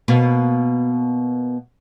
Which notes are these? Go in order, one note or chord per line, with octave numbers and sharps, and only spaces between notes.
B2 A#3